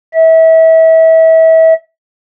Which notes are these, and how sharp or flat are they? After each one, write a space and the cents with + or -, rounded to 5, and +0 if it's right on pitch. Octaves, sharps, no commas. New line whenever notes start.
E5 -30